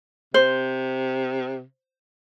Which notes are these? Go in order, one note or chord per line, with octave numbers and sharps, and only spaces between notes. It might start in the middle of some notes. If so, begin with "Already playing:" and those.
C3 C5